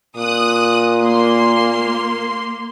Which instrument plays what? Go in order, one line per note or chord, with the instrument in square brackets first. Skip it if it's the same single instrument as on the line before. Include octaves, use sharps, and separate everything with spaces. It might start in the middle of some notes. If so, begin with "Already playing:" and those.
[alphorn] A#2 [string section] D#6 F#6
[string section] A#3 C6